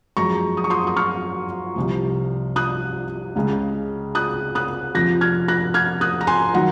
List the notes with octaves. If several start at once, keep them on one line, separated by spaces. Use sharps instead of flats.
F#2 F3 G#3 A#5 C#6
D#6
C#6
C6 D#6
D#6
C#6 F6
C2 C3 F3
D#6 F#6
C#2 C#3 G#3
D#6 F#6
D#6 F#6
F2 C3 F3 F#6 A#6
F6 G#6
F#6 A#6
F6 G#6
D#6 F#6
A#5
G#5 C6
D#3 F#3 F#5 A#5